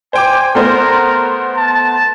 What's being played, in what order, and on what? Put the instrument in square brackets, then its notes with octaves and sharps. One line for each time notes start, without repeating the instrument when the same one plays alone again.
[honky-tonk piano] C5 G5 D6 [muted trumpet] G#5
[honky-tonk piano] A3 B3 C5 [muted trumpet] A#4
[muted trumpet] A5